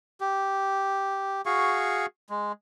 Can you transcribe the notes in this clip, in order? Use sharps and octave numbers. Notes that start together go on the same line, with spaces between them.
G4
F#4 G#4 F5 C#6
G#3